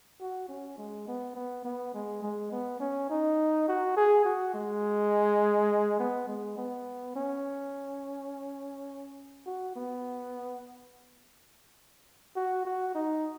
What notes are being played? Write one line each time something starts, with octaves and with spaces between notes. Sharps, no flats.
F#4
C#4
G#3
B3
B3
B3
G#3
G#3
B3
C#4
D#4
F#4
G#4
F#4
G#3
B3
G#3
B3
C#4
F#4
B3
F#4
F#4
D#4